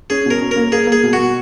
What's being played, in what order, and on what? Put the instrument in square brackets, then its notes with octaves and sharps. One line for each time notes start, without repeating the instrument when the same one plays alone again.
[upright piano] C#4 [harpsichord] G#4
[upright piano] B2 [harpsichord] A#4
[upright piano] C#4
[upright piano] A#3 [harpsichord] A#4
[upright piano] A#3 [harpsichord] G#4
[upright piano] A#3
[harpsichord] G#4
[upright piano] B2
[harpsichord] F#4
[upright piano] B2